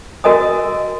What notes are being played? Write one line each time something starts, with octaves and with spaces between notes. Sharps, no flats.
F#4 A#4 D#5 G#5 D#6